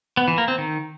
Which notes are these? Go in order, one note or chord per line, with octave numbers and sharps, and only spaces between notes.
B3
E3
A#3
C4
D#3